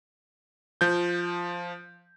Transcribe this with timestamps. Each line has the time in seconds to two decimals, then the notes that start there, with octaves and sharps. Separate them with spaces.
0.81 F3 G6